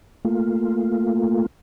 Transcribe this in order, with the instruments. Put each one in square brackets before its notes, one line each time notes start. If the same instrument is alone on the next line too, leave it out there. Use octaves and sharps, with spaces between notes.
[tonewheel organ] A3 A#3 F4